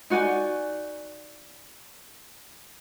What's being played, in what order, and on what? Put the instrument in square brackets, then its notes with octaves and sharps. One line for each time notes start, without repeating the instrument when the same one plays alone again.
[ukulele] D#4 F#4 D5 G#5